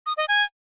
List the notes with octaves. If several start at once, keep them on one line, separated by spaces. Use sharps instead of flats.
D#6
D#5
G#5